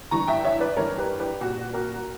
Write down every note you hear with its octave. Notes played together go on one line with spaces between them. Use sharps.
G2 E3 A#5 C#6
E5 G5
C#5 E5
B4 D5
G2 E3 A#4 C#5
G4 B4
G4 B4
A#2 F#4
F#4 A#4